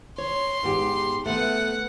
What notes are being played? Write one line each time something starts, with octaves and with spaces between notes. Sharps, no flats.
C#5 C6
G#2 B3 G4
A3 B3 F#5